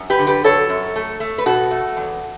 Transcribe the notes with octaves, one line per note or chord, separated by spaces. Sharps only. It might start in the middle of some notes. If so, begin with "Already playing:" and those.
Already playing: F#2
G4 B4
D3
G4 B4
F#3 A4 C#5
F#2
A3
A3
B4
B2 F#4 A4
A3
E2